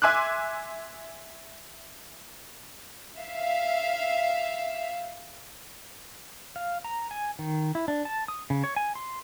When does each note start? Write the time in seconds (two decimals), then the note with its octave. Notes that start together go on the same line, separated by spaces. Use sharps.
0.02 E5 G#5 C6 D6 F#6
3.18 E5 F5
6.56 F5
6.85 A#5
7.11 G#5
7.39 D#3
7.75 E4
7.88 D4
8.05 A5
8.28 D#6
8.50 C#3
8.64 C#5
8.76 G#5
8.95 C6